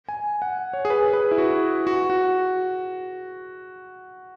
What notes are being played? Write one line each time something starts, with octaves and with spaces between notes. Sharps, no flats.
G#5
F#5
C#5
G#4
B4
G#4
B4
E4
F#4
F#4
F#4